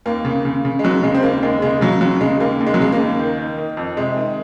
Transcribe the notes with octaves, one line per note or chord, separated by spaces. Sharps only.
D#2 A#3
C#3
C#3
C#3
G#3
D#2 F#3
C#3 G#3
C4
D#2 A#3
D#2 G#3
C#3 G#3
C#3 F#3
D#2 F#3
C#3 G#3
D#2 A#3
D#2
G#3
F#3
C#3 G#3
A#3
D#2
D#3
D#3
D#3
F2
C3 G#3
D#3